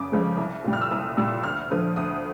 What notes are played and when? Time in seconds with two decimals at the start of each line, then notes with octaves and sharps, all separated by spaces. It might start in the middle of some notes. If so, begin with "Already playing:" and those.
Already playing: F#2 C#3 D6 D#6
0.12 C#3 F3 G#3
0.37 C2
0.64 A#2 G3
0.73 F6
0.81 E6
0.90 C2 D#6
1.17 A#2 G3 E6
1.43 D2 F6
1.71 D3 F3 D#6
1.96 D2 D#6